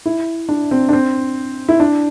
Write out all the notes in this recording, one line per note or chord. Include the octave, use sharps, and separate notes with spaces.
E4
D4
C4
D4
C4
E4
D4